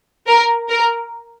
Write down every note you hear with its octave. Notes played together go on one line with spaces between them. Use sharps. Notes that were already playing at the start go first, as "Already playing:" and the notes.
A#4
A#4